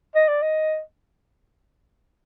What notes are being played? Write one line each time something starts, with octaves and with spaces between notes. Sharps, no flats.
D#5
D5
D#5